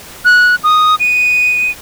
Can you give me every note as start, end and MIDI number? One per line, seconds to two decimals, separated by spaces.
0.25 0.55 90
0.64 0.95 87
1.00 1.71 99